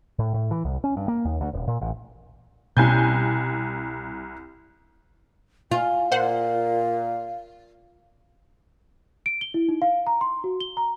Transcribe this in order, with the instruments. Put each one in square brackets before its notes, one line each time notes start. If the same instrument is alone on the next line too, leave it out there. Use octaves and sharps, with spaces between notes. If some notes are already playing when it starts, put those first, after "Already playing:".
[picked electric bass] A2
A2
E3
C2
C#4
G2
A#3
D#2
D2
D#1
A#2
A1
[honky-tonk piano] C2 G#5 G6 [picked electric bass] B2 C4 C#4
[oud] F4 [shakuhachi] G#5
[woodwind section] A#2 [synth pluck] C5 F#5 [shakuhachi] F5
[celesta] D7
G7
E4
D#4
F5
A#5
C6
F#4
G7
A#5